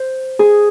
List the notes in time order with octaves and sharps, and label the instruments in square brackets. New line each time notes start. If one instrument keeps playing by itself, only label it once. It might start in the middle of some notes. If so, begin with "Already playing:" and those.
Already playing: [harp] C5
G#4